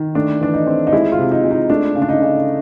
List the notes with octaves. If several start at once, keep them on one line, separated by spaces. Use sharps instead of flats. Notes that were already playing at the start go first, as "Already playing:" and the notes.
Already playing: D#3
A3 D4
E3 D4
D#4
C4
D#4
G#3 E4
F4
C3
D#4
G#3
D#4
A3 D4
C#3
D4
D#4
C#3